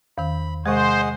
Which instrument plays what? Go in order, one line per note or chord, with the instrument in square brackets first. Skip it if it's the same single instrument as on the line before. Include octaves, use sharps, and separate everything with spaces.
[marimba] E2 D#3 [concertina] B5
[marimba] C3 G#3 [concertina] G#4 D#5 F#5 [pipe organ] C5